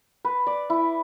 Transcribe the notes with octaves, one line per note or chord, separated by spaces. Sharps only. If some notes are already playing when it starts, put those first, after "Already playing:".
B4
D5
E4